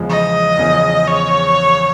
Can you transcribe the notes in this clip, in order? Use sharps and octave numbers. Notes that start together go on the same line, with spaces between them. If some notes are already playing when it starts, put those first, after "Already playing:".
Already playing: E2 C#3 F3 G#3
D#5
E2 C#3 F3
C#5